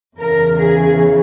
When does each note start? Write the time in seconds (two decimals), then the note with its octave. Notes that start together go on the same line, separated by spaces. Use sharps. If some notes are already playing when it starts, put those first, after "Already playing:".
0.19 E2 C#3 E3 A#4
0.59 G#4